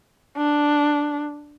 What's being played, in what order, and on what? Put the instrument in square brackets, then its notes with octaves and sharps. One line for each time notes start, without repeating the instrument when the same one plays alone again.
[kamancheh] D4